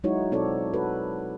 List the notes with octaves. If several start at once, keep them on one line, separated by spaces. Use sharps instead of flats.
F#3 G#3 D#4 E4 F#4 C#5
B2 C4 D#4 A4 C#5 D5
F#4 A4 B4